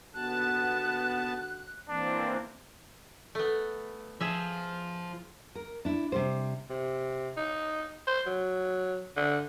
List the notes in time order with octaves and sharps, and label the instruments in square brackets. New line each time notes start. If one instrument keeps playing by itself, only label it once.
[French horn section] D#2 D3 F#4 [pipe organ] B3 A5 [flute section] F#6
[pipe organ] E3 A#3 C4 [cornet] D4
[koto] A3 B3
[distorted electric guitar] F3 [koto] G#4 E5
[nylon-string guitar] A#4
D4 E4
C3 G3 C5
[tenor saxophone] C3
D#4
C5
F#3
D3